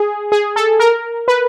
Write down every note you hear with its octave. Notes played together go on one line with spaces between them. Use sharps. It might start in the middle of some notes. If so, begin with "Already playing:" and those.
Already playing: G#4
G#4
A4
A#4
B4